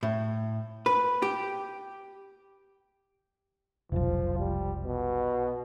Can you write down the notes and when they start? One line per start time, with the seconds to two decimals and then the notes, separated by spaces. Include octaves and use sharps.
0.03 A2
0.86 B4
1.22 G4
3.92 F1 B1 F3
4.39 G3
4.84 B2